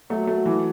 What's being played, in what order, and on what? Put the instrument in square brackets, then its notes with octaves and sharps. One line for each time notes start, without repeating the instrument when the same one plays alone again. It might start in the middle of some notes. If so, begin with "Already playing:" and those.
[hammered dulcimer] F#3 [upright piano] A3
[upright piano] A3
E3